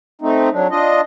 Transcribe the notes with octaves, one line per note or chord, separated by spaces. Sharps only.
A3 C4 D#4
F#3 D4
D4 F4 D#5